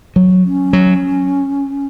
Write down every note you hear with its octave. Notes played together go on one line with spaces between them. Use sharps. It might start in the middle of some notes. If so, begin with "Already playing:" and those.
F#3
C#4
F#3